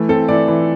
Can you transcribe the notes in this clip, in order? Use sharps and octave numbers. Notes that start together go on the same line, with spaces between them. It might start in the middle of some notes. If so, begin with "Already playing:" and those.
Already playing: E3 A3
C4 A4
E3 D5
E3